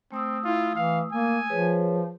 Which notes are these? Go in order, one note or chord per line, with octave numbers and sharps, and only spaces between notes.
A3 C4 D#6 E6
E4 F4
E3 F5
A#3 G#5
F3 G#4 B4 C#5